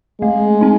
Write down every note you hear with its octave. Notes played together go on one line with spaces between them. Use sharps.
G#3 A3
C4 D#4